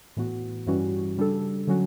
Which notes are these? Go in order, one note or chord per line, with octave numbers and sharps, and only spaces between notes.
A2 E3 B3 F#4
G2 E3 G3 C#4 F#4
C#3 G3 D4 A4
D3 F#3 C#4 F#4